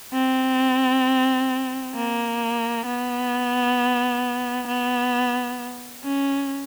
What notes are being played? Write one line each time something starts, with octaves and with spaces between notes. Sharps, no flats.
C4
A#3
B3
B3
C#4